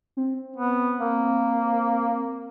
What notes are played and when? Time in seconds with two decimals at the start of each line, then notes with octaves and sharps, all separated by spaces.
0.17 C4
0.57 B3
1.00 A#3